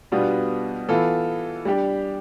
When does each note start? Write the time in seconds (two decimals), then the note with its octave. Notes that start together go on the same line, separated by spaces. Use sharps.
0.12 B2 G3 B3 D4 F4
0.89 E3 B3 F4 A4
1.65 G3 D4 G4